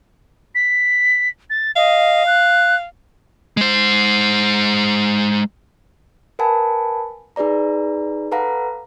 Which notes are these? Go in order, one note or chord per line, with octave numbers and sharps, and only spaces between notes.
B6
A6
D#5 F5
F#6
G#3 C5
A#4 B4 F#5 G#5 A5 B5
D#4 G#4 B4 D5 A#5
A4 B4 F5 F#5 A#5